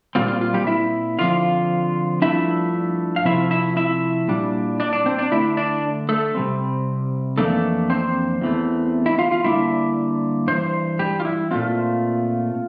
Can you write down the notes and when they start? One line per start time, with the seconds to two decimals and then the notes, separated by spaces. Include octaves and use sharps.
0.15 A#2 G3 C4 F4
0.28 F4
0.41 F4
0.54 G3 G4
0.67 E4 E5
1.19 D3 F3 C4 F4 F5
2.22 G2 F3 A3 D4 E4 E5
3.16 F5
3.25 C3 F3 A3 C4 E4 E5
3.51 E4 E5
3.77 E4 E5
4.28 A#2 G3 D4
4.80 D4 D5
4.93 D4 D5
5.06 C4 C5
5.18 D4 D5
5.31 D3 A3 D4 E4 E5
5.57 D4 D5
6.09 A3 A4
6.35 C3 G3 C4
7.38 F2 E3 A3 A#3 D4 A4
7.90 C4 C5
8.41 E2 E3 A3
9.06 E4 E5
9.19 F4 F5
9.31 F4 F5
9.44 D3 G3 A#3 D4 E4 E5
10.47 G2 E3 C5
10.99 G3 G4
11.20 F4
11.25 E4
11.51 A#2 A3 C4 F4